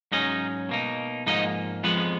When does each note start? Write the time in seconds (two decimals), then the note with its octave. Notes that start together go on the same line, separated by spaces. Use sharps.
0.12 G#2 F#3 C#4 D#4 D#5
0.69 B2 A#3 D#4
1.27 G#2 F3 A#3 D#4 D#5
1.83 F2 F3 G#3 B3 B4